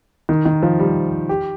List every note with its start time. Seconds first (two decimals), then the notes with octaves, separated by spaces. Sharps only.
0.29 D#3
0.45 D#3
0.63 F3
0.80 G3
1.29 G4